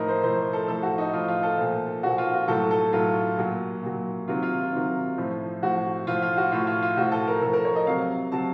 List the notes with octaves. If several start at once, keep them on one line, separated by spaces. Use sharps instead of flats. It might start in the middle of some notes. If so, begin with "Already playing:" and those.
Already playing: A2 F3 D#4 A#4
C5
A2 F3 C5
A4
A2 F3 A4
F#4
D#4
A2 F3 F4
F4
A4
A#2 F3
A#2 F3 F#4
F4
F#4
A2 F#3 A4
A4
A2 F#3 F4
A#2 F#3
A#2 F#3
C3 D#3 F#3 F4
F4
C3 D#3 F#3
A2 F3
A2 F3 F#4
A2 F3 F4
F4
F#4
A2 F3 F4
F4
F4
A2 F3 F#4
A4
A#4
A2 F3 A4
A#4
C#5
D#5
C3 F#3 F5
C3 F#3 A5